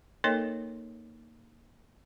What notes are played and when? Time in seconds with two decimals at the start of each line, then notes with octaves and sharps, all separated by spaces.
0.24 A#3 D#4 A4 A#4 C#5 D#5